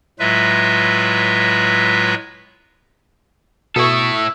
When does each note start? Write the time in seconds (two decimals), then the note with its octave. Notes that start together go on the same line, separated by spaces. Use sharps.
0.19 A2 F#3 G#3 F4 B4 E5
3.76 B2 E4 A4 E5 C#6 D#6
4.13 E5